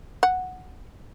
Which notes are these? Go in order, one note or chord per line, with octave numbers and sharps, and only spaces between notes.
F#5